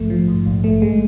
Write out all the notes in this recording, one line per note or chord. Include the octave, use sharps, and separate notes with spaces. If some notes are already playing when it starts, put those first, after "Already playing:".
Already playing: A#1 G#2 F3 A3
F3
G#2
A#1
A3
G#3